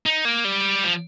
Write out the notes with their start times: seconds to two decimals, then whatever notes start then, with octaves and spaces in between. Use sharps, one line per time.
0.06 D#4
0.25 A#3
0.45 G3
0.83 F3